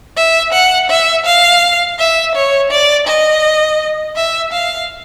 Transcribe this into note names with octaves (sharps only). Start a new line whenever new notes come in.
E5
F#5
E5
F5
E5
C#5
D5
D#5
E5
F5